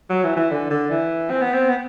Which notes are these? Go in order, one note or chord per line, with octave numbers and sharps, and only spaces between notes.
F#3
E3
E3
D3
D3
E3
C4
B3
C4
B3